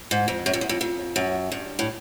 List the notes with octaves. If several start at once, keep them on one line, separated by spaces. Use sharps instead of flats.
G#2
F2
F#2
F2
E2
F2
F2
F#2
G2
A2